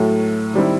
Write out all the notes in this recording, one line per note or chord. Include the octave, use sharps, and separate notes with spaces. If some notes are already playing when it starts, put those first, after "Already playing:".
Already playing: A2 F#3 A3
D#3 G3 C4 E4